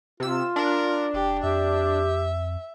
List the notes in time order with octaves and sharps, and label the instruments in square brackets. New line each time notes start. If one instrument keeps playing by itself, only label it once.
[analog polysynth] C3 E6 [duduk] F4
[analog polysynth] D4 [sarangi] A#4
[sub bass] F1 [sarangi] G4
[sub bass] F2 [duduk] G4 [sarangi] E5